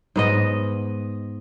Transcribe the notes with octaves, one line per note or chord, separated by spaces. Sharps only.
G#2 B3 D#5